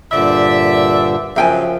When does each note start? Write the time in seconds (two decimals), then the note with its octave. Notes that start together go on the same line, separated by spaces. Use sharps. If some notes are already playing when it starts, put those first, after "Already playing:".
0.12 G2 A#2 D3 C5 D5 E5
1.36 F#2 C#3 F3 E5 G5 G#5